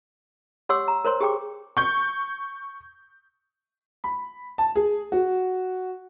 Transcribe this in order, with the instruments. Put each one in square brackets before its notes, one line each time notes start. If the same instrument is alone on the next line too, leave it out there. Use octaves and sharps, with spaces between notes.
[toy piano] G4 C#5 F#5 C6 D6 E6
A#5
A#4 C5 C#5 C6
G4 G#4 G5 D6
[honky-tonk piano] C#6 G6
[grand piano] B5
A5
G#4
F#4